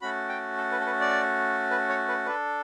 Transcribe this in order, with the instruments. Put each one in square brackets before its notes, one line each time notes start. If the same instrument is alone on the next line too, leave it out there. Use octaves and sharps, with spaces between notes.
[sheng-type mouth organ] A3 C#4 F#4 B5
G5
A4
B4
A4
B4
D5
B4
C#5
B4
D4 A4 B4